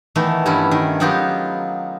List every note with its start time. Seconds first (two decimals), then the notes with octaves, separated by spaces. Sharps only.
0.15 D#3 E3 A3 B3
0.46 G2 G3 C#4 E4
0.71 D#3
1.00 F#3 B3 D#4 F4 G4